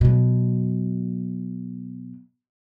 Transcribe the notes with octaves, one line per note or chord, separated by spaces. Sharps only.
B2 F#3